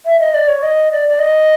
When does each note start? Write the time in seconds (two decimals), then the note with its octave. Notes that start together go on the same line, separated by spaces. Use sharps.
0.06 E5
0.20 D#5
0.34 D5
0.48 C#5
0.63 D#5
0.92 D5
1.09 D5
1.19 D#5